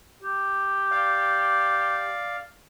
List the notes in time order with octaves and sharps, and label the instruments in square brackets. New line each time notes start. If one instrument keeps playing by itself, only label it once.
[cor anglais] G4
[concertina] D5 F5